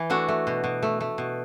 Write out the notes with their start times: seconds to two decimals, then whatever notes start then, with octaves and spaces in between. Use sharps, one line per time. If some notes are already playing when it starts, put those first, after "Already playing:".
Already playing: E3
0.10 A3 D4 F#4
0.28 A3
0.47 B2
0.64 B2
0.83 A3
1.01 A3
1.18 B2